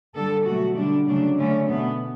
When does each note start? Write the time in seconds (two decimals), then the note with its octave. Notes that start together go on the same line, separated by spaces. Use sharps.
0.15 D3 G3 A4
0.46 B2 F#3 A3 F#4
0.77 D3 G3 D4
1.08 C#3 F#3 A3 D4
1.38 D3 F#3 A3 C#4
1.69 B2 A3 B3